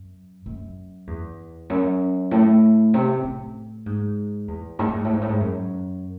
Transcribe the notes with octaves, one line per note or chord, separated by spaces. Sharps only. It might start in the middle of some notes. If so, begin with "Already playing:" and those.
Already playing: F#2
F#2
E2
F#2
A2
C3
A2
G#2
E2
G#2
A2
G#2
A2
G#2
A2
G#2
F#2